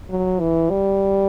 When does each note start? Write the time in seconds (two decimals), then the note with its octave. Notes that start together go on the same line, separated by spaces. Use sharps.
0.10 F#3
0.40 E3
0.70 G3